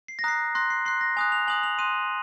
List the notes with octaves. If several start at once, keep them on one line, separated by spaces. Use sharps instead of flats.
C7
A#6
A#5 D#6 F#6 C7
C6 F#6 A#6
C7
C6 F#6 C7
A#6
G#5 D#6 F#6 F7
F7
G#5 D#6 F#6 F#7
F7
C6 D#6 F#6 D#7